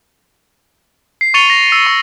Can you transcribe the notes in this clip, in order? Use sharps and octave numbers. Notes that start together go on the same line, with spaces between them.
C7
C#6 A6 C#7 D#7 F7 G7
A#6
E6
C#6